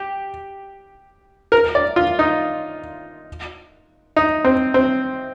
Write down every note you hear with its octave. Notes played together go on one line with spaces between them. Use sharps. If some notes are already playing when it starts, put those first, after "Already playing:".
Already playing: G4
A#4
D5
F4
D#4
D#4
C4
C4